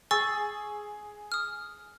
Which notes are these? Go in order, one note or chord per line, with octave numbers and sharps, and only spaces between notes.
G#4 C#6 E6 A6
D#6 F6